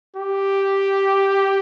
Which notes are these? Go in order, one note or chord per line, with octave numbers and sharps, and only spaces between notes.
G4